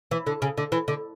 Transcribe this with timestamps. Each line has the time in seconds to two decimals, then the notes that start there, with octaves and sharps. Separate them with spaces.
0.11 E3
0.27 D3
0.42 C#3
0.57 D3
0.72 E3
0.88 D3